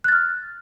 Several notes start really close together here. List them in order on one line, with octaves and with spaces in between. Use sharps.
F#6 A6 F6